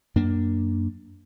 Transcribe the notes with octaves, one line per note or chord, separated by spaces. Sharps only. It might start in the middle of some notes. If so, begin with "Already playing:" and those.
F#2 A#3 D4